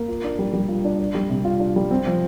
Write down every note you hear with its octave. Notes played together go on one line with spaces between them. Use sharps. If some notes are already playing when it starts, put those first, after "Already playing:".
Already playing: A#3
F4
D4
G3
G3
F4
D4
D4
G3
C3
F4
D4
G3
C4
F3